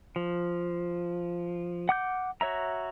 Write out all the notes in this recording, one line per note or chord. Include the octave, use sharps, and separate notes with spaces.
F3
F#5 D6 G6
F#4 C#5 E5 A#5